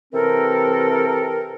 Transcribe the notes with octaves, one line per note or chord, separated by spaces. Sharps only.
C3 E3 C4 A4 A#4